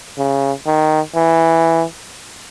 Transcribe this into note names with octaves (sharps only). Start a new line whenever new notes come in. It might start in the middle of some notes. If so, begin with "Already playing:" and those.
C#3
D#3
E3